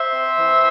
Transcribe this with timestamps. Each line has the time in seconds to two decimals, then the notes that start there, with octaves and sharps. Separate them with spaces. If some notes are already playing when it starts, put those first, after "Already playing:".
Already playing: C5 E5
0.15 C4
0.37 E3